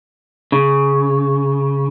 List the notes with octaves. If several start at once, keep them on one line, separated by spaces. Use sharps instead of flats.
C#3